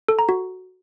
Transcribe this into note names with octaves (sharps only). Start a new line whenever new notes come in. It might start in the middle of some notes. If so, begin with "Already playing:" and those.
A4
A#5
F#4